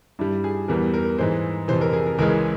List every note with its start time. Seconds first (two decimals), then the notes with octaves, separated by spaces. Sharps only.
0.19 G2 G3 E4
0.44 G#4
0.68 E2 E3 G3 A#4
0.94 A#4
1.19 G#2 E3 G#3 C5
1.68 F2 C3 E3 C5
1.81 A#4
1.93 G#4
2.06 A#4
2.19 C#2 C#3 E3 G#3 A#4